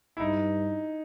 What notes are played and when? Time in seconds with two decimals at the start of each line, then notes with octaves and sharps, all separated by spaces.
0.17 E4
0.20 G2 D#4